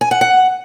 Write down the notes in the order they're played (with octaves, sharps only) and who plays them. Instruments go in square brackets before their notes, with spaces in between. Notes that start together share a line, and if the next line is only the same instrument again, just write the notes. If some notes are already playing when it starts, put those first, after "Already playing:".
[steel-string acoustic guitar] G#5
F#5
F#5